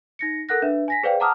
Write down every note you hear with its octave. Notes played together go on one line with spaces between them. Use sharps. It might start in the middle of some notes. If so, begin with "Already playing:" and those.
D#4 A#6 C#7
A4 A#4 F#5 F#6 A#6
D4 B4 E5
G#5 A#6 B6
G#4 B4 C5 D5 F5 G5
F#5 A5 A#5 D6 D#6 F6